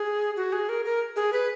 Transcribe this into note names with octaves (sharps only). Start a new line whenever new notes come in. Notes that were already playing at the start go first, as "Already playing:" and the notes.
Already playing: G#4
F#4
G#4
A#4
A#4
G#4
B4